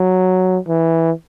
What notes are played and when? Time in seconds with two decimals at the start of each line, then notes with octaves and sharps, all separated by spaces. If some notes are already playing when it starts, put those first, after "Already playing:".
Already playing: F#3
0.68 E3